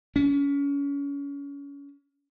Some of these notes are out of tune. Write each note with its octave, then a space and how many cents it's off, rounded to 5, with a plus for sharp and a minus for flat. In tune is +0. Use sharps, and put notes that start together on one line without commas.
C#4 +30